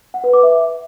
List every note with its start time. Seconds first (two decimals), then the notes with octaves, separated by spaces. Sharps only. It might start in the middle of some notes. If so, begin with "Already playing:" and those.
0.14 F#5
0.24 B4
0.33 D6
0.43 E5